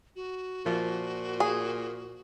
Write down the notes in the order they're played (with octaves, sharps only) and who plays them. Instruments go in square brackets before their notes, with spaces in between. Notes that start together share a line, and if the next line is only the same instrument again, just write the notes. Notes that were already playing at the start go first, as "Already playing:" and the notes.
[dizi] F#4
[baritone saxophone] A#2 [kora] F3 E5 F5
[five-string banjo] G#4